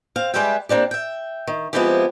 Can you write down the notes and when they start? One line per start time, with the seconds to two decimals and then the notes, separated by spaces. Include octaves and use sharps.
0.16 C4 F5
0.34 G3 G#3 G4 B4 E5 G5
0.69 A#3 C4 D4 G4
0.91 E5 G5
1.47 D#3
1.73 F3 G#3 B3 C4 E4 G4